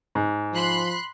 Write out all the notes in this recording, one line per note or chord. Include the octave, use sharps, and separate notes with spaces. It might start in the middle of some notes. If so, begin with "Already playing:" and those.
G#2
F3 B5 C6 F#6